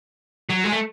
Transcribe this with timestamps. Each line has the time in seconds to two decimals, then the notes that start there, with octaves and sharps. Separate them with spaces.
0.50 F#3
0.65 G#3
0.73 A3